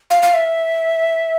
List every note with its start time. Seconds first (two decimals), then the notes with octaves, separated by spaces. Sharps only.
0.10 F5
0.22 F5
0.34 E5